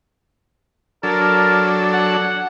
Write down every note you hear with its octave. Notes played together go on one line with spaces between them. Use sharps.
F#3 D4 A4 A#4
F#5